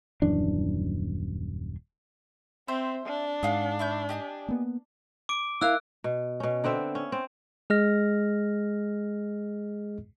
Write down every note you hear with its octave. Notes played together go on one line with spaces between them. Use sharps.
D#1 F#2 E3 D4
C4 C5 E5
D4
G#2 G#4 F5 F#5
E4 C#6 G6
G4 D#5 G#5
A#3 B3
D6 D7
E4 A#4 F5 E6 F#6
B2
B2 C#4
D3 B3 C4 E5
C#4
C4
G#3 G#4 D#5 F6 A#6